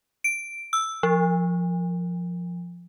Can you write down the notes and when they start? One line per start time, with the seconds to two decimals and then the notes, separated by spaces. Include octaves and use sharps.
0.24 D7
0.73 E6
1.03 F3